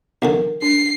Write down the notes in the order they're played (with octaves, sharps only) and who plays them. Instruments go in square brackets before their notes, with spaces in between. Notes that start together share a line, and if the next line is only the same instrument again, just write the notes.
[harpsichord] B1 E2 D3 [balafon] A#4
[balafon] D4 [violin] C7